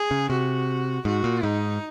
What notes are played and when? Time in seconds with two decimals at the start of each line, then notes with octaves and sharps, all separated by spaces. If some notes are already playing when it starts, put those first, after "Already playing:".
Already playing: G#4
0.11 C#3
0.30 C3 F#4
1.05 G#2 F#4
1.24 A#2
1.43 G#2 D#4